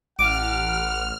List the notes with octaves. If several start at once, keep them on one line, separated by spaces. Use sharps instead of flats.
A1 F#5 D6 F6